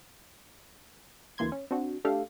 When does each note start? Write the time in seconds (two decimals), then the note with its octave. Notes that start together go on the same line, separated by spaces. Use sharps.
1.38 D2 E3 A#3 C6 G#6
1.52 C#4
1.71 C4 D4 F#4
2.05 A3 D4 G4 A4 F5